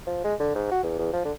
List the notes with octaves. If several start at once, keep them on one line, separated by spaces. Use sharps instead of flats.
F3
G#3
D3
G#2
F#4
E2
E2
F3
D3